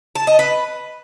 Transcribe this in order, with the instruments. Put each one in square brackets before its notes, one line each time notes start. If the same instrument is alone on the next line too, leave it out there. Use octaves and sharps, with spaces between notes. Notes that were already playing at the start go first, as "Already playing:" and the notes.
[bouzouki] A5
D#5
B4